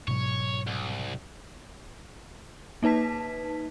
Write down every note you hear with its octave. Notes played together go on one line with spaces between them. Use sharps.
G#2 B2 F#3 C#5
C2
A#3 D#4 B4 A5 B6